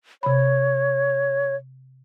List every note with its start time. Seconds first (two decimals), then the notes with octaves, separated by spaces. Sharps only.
0.23 C3 C#5 B5